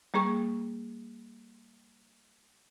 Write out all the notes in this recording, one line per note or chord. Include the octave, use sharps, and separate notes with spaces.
G3 A#3 G#4 C#6